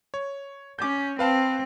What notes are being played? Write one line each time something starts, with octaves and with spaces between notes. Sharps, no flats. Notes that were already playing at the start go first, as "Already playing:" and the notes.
C#5
C#4 D6 G6
C4 B4 F5 A5